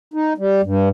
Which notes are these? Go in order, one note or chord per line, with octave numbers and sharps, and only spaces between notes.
D#4
G3
G2